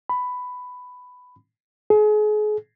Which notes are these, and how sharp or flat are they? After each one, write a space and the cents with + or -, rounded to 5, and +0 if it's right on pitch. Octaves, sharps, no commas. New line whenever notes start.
B5 +10
G#4 +35